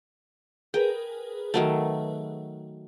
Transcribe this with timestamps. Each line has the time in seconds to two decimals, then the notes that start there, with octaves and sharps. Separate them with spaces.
0.74 G#4 A#4 B4 G5
1.54 D#3 F#3 A3